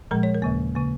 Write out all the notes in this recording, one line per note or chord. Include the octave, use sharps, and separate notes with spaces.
A#2 F3 G#3 A#4
C#5
A#4
D#2 C#3 A#3
C#3 A#3